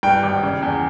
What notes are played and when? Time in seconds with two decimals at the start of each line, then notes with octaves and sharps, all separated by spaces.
0.03 G2 G5
0.23 G#1
0.43 C#3
0.62 E2